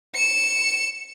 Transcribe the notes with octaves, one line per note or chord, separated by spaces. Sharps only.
C#7 E7